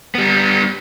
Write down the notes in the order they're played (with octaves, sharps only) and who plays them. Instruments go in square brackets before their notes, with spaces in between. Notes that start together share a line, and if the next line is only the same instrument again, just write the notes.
[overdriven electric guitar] G3 B3